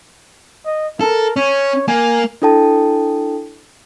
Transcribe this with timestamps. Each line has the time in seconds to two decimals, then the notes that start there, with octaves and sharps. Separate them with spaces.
0.66 D#5
1.01 A4 A#4
1.36 C#4 C#5
1.88 A#3 G#5
2.42 D4 E4 A4 G5 A5